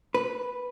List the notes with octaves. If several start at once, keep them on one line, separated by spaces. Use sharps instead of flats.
B4